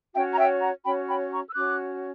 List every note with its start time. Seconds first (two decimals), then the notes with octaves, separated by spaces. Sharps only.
0.14 C#4 F#4 C#5 E5 G5
0.33 A#5
0.37 E5 G5
0.61 F#5 A#5
0.84 C#4 F#4 C#5 G5 B5
1.08 G5 B5
1.32 A#5 C#6
1.48 E6
1.55 C#4 F#4 C#5 D6 F#6